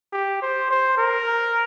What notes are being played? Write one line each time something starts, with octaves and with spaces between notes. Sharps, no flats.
G4
C5
C5
A#4